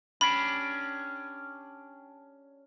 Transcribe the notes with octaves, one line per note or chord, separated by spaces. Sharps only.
C#4 D4 G4 B5